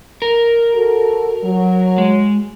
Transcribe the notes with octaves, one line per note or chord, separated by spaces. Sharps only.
A#4
F#4 A4
F#3
G#3